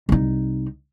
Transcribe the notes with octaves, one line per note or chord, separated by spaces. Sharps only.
C2 D#4